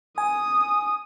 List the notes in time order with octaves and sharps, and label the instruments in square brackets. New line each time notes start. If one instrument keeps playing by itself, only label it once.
[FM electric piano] G#5 [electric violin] D#6